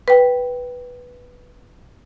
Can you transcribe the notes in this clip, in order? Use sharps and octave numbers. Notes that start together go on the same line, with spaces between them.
B4 G5